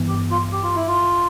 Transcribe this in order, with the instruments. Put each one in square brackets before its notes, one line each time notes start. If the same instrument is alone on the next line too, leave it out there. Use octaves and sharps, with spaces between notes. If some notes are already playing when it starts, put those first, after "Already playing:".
Already playing: [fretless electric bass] G2 E3 B3
[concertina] G4
F4
G4
F4
E4
F4